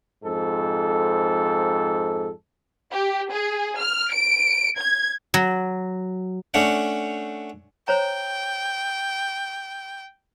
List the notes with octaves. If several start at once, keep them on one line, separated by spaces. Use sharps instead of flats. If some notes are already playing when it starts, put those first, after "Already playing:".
F2 G#2 A4
G4
G#4
F6
D7
G#6
F#3
A3 C#4 D4 C#5 F#5
C5 C#5 G5 A#5